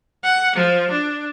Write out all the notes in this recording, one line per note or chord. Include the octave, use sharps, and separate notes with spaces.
F#5
F3
D4